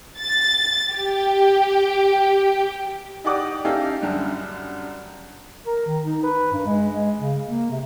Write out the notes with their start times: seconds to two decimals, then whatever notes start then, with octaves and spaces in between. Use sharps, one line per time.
0.19 A6
0.91 G4
3.24 D#4 G4 D5 F#5 D6 D#6
3.65 C#4 D#4 G4 A4 E5 F5
4.02 F#2 D3 G3
5.66 A#4
5.87 D#3
6.04 D#4
6.23 B4
6.52 G2
6.65 G#3
6.93 G#3
7.20 C#3
7.46 A#3
7.70 C3